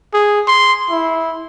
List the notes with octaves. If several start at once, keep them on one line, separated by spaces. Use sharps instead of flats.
G#4
C6
E4